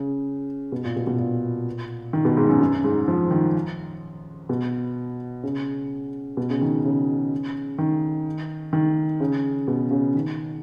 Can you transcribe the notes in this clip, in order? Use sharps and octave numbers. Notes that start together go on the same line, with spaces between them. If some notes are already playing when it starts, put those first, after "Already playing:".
Already playing: C#3
B2
A#2
B2
B2
A#2
D#3
B2
G#2
F#2
F#2
G#2
F3
D#3
B2
C#3
B2
C#3
D#3
C#3
D#3
D#3
C#3
B2
C#3
D#3